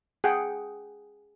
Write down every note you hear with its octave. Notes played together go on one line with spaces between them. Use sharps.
G#4 F#5 G5